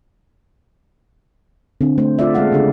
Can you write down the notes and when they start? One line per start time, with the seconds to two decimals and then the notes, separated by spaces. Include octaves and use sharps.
1.81 D3 C4
1.98 A3 C5
2.19 F4 D5 E5
2.34 G#3 B3 A4 F5 F#5
2.52 C#3 A3 D4 G4 A4